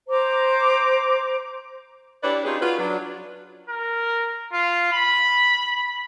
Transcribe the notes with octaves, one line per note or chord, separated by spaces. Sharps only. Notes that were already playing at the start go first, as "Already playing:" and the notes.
C5 A#5 D6
D4 E4 G4 B4 C#5 D5
C#4 D#4 F4 G4 G#4
F4 F#4 B4
F#3 D4
A#4
F4
B5